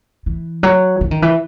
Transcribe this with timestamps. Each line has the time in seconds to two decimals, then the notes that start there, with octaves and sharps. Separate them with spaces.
0.26 E3
0.63 F#3
1.01 E3
1.11 D#3
1.22 E3